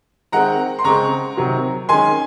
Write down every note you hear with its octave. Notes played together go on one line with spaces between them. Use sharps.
D#3 G#3 C4 F#5 A#5
C6
C#3 G#3 C4 A#5 C#6
C3 D#3 F#3 C4
D#3 G#3 C#4 G#5 C6